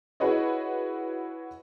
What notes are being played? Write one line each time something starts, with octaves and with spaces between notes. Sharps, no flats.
E4 F#4 G#4 B4 C#5 D#5